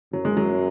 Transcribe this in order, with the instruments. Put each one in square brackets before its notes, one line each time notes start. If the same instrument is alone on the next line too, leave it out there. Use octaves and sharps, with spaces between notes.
[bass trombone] F#2 [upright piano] F#3
[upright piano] G#3
F#3